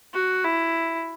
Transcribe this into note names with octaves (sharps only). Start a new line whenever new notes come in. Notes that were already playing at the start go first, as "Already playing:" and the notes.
F#4
E4